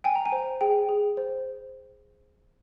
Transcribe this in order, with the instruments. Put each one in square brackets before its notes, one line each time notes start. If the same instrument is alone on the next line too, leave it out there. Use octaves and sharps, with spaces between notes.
[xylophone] G5 G#5
A#5
G#5
C5
G#4 G5
G#4
C5